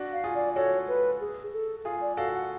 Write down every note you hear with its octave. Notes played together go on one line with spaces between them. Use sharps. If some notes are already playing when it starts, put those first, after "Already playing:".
Already playing: D4 F#4
F5
F4 G#4
D5
F#4 A4 C#5
B4
G#4
A4
F4 G#4
D5
F#4 A4 F5
F#5